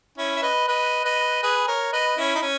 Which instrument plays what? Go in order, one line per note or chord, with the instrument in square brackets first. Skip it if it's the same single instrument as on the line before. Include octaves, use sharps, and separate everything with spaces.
[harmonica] C#4 E4
E5
B4 D#5
B4 D#5
B4 D#5
G#4 B4
A#4 C#5
B4 D#5
C#4 E4
D#4
C#4